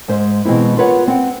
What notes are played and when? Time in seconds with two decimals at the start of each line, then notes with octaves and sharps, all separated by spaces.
0.08 G#2 G#3 C5 E5
0.45 B2 E3 G#3 C4 E4
0.77 F4 G#4 A#4 B4 C#5 F#5
1.08 C4 F#5